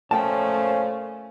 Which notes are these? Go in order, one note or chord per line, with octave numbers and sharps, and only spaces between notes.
F#2 A#2 F3 A3 C#4 G5 A5